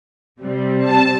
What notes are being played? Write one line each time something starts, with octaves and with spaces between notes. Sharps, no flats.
C3 G3 C4
A5